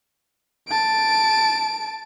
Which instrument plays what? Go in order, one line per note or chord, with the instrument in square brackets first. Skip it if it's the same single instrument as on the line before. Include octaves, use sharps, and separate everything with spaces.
[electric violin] A5 D7